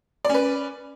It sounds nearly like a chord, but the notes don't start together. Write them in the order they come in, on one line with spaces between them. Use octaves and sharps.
D5 C#4 B4